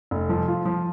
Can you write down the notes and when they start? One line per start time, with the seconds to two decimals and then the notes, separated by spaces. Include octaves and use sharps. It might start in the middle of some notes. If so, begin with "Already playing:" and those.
0.11 F1
0.29 F3
0.48 F4
0.66 F3